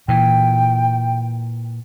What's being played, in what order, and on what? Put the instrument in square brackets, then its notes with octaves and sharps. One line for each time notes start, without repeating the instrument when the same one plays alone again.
[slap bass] A#2 E3 [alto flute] G5